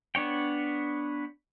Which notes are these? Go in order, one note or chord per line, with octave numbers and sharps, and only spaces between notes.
B3 D4 C#5 G5